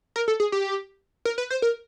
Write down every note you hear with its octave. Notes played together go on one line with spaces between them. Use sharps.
A#4
A4
G#4
G4
A#4
B4
C5
A#4